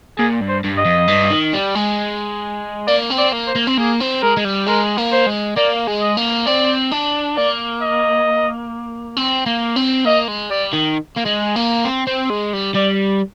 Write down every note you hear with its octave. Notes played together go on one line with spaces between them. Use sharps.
A#2 G#4
G2
C5
G2
D#5
F2
G2
D#3
G3
G#3
A#3 D5
C4
D5
A#3
C5
A#3
C4
A#3 G#4
C4
G#3 A#4
G#3
G3
G#3 A#4
A#3
C5
G#3
A#3 D5
G#3
D#5
A#3
C4 D5
D4
A#3 D5
D#5
C4
A#3
C4
A#3 D#5
G#3
G3 D5
D#3
A#3
G#3
A#3
C4
C4
G#3
G3
G3 D5